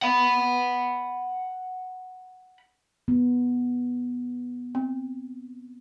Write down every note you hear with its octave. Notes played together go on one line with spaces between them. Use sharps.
F#5 B5
B3
C4